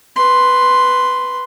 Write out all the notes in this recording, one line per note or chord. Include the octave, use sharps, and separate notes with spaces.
B4 C6